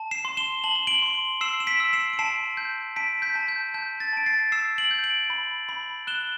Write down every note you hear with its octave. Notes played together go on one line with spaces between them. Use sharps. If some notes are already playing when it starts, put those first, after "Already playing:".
Already playing: A5
C7 E7
C6
E7 G7
A5 F#7
E7
D7 F#7
C6
E6 C7 E7
E7
B6 D7
E6
C7 E7
D7
A5 C7 E7
G6
A5 B6 D7
G6 B6
A5
G6
A5 G6
A6
A5 D7
A6 C7
E6 C7 E7
D7 F#7
G6
D7 F#7
B5
B5
F#6 E7 G7